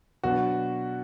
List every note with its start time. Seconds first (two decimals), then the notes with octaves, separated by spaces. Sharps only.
0.24 B2 F#3 B3 D4 F#4